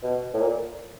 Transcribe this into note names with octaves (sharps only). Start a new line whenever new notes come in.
B2
A2
A#2